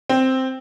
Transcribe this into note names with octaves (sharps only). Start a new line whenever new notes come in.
C4